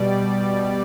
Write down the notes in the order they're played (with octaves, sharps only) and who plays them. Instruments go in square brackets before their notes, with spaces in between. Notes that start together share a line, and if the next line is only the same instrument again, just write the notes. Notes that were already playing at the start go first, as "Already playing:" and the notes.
Already playing: [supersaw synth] B2 G3 D5